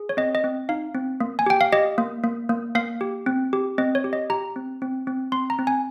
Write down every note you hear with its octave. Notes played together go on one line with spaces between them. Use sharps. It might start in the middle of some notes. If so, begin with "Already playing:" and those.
Already playing: G#4
C#5
C4 D#5
D#5
C4
D#4 F5
C4
A#3
G#5
G4 G5
F5
G4 D#5
A#3
A#3
A#3
A#3 F5
G4
C4
G4
C4 D#5
C#5
G4
D#5
G4 A#5
C4
C4
C4
C4 C6
A#5
C4
G#5